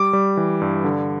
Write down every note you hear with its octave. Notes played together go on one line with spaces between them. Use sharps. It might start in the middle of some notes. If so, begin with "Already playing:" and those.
Already playing: G3 D6
G3
E3
G2
D3